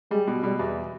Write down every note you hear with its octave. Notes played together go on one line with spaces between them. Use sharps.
G3 G#3
B2
B2 G3
E2